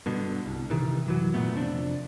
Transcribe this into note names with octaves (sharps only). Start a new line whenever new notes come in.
G2 B2 D3
C2
C3 D#3 E3
F#2 E3 F#3
A#2 D#3 A3 B3
F2 C3 D4